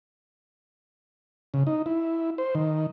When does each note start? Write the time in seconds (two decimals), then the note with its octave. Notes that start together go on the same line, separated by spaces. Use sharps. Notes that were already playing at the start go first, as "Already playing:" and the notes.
1.54 C#3
1.67 D#4
1.86 E4
2.38 C5
2.55 D#3